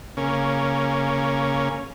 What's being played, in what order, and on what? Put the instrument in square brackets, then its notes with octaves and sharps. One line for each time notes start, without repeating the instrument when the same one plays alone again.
[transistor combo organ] C#3 A#3 C#4